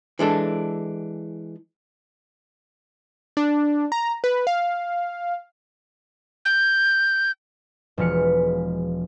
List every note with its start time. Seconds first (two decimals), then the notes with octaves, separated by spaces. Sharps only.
0.19 E3 G#3 D4 A4
3.37 D4
3.92 A#5
4.24 B4
4.47 F5
6.45 G6
7.98 E1 F3 G#3 B4 F6 C#7